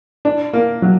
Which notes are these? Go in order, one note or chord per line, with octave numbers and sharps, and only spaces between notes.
D4
A#3
F#3